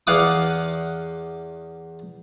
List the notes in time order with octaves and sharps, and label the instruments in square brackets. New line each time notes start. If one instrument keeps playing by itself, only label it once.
[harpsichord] E2 F5 F#5 D6 D#6